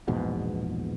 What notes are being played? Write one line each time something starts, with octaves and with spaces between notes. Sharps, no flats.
A#1 E2 G#2 B2